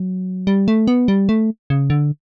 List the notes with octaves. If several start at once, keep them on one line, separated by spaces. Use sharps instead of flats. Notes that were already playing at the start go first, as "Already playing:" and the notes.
Already playing: F#3
G3
A3
B3
G3
A3
C#3
D3